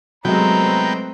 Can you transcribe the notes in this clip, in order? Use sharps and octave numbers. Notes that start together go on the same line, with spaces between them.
C2 F#3 G#3 A3 B3 C4 G5 A#5